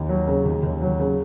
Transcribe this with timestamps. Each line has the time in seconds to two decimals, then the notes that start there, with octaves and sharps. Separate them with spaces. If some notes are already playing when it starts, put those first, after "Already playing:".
Already playing: D#2
0.09 F#3
0.27 C#3
0.45 D#2
0.63 D#2
0.82 F#3
1.00 C#3